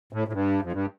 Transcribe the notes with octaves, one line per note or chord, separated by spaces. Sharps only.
A2
A2
G2
F2
G2